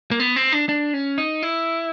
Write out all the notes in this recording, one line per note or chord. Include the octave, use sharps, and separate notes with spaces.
A#3
B3
C4
D4
D4
C#4
D#4
E4